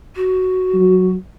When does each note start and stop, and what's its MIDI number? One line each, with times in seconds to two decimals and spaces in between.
0.15 1.11 66
0.74 1.14 54